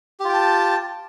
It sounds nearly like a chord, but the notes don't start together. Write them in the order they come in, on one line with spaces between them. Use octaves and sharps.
G4 F4 G5 A5